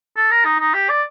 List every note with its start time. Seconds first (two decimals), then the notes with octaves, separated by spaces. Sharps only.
0.17 A4
0.31 A#4
0.45 D#4
0.60 D#4
0.74 G4
0.89 D5